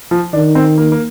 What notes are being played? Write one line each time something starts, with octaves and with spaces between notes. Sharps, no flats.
F3
D#3 D4
C4
A#3
A#3